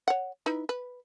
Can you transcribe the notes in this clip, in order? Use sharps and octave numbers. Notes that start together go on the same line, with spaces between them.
C#5 F#5
D#4 E4 B4
B4